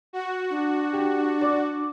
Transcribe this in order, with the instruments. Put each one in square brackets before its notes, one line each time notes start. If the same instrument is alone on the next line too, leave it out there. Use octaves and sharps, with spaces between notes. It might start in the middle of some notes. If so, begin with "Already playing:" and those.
[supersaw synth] F#4
[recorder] D4
[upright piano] G4
D5